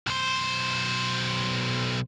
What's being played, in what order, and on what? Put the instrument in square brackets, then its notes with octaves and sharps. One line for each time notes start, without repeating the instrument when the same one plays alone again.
[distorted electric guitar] B1 C5